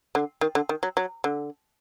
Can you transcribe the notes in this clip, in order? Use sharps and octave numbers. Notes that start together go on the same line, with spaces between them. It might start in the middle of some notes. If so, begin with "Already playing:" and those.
D3
D#3
D3
D#3
F#3
F#3
D3